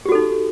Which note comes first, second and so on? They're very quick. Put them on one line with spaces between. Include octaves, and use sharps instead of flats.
G4 F#4 A4 D#4